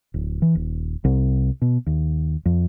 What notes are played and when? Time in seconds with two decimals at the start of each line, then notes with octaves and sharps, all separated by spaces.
0.14 D1
0.42 E3
0.55 D#1
1.04 C2
1.62 B2
1.86 D#2
2.45 F2